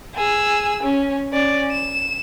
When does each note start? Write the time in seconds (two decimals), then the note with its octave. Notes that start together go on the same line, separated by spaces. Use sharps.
0.15 G#4 E6
0.83 C#4
1.33 C#4 D5
1.72 E7